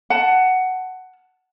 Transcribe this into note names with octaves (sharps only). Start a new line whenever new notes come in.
F#5 A5